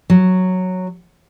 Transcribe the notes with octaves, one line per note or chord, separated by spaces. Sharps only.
F#3